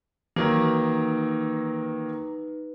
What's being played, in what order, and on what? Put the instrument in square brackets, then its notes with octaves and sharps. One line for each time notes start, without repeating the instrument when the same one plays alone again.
[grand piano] D#3 F#3 A#3 [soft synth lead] E3 [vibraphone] D#4 B4